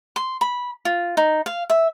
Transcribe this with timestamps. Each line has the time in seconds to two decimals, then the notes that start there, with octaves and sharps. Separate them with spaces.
0.16 C6
0.41 B5
0.85 F4
1.17 D#4
1.46 F5
1.70 E5